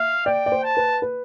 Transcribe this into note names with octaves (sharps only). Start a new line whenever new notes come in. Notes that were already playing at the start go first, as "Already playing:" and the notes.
Already playing: E5 F5
D5 G5
D5
C5
A5
B4
B4